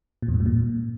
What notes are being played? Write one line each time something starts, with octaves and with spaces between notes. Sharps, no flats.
A#2
E2
G2
G#2
A#2